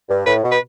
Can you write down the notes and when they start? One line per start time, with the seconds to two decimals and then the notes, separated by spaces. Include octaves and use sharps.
0.09 G2
0.26 A2 B4
0.43 B2
0.51 B4